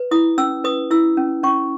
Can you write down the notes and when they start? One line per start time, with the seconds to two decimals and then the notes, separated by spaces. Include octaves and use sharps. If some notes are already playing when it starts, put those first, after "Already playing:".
Already playing: B4
0.11 E4 D#6
0.38 C#4 E6
0.64 B4 D#6
0.91 E4 E6
1.17 C#4
1.43 C#4 C#6